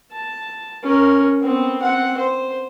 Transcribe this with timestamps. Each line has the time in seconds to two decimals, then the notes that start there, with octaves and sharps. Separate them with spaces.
0.12 A5
0.83 C#4 A#4
1.40 B3 C4
1.82 C4 F#5
2.18 C5